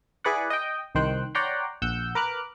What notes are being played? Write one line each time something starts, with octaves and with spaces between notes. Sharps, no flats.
E4 G#4 B4 D5 F#5
D#5 G5
C2 D#3 C5 G5 F#6
C#5 D5 F#5 G5 A#5 C6
A#1 F#5 E6 G6
A#4 B4 D6 F6 F#6